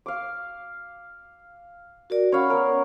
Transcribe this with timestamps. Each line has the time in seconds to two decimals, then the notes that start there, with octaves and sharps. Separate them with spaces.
0.06 F5 D6
2.10 F#4 A#4 D5
2.32 C#4 C#5 F5 F#5 B5
2.50 B3 A#4